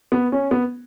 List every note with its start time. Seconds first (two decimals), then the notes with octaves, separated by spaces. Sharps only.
0.12 B3
0.32 C#4
0.51 B3